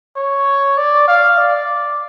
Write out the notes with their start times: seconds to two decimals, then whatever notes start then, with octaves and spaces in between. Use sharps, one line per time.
0.17 C#5
0.78 D5
1.08 F5
1.38 D5